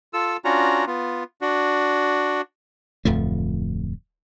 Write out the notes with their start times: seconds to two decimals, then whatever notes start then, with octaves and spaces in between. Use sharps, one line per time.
0.13 F4 A4 E6
0.45 C#4 D4 F4 F#4 A#5
0.87 B3 F4
1.41 D4 F#4
3.05 D1 F2 F3 A3